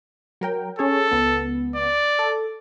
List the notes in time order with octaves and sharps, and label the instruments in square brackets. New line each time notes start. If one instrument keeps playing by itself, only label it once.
[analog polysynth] F#3 A#4 G5
[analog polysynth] C#4 G#4 C#5 [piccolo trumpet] A4
[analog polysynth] C#2 B3
[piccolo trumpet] D5
[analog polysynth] A4